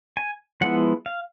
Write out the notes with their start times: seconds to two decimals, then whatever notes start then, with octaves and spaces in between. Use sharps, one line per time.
0.17 G#5
0.61 F3 G#3 B3 E4 F#5
1.06 F5